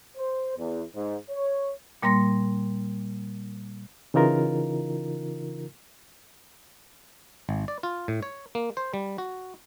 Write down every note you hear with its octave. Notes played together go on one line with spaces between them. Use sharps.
C5
E2
G#2
C#5
A#2 G3 A#3 C6 A#6
C#3 E3 D#4 F4 A#4
G#1
D5
F4
A2
C#5
A#3
C5
G3
F#4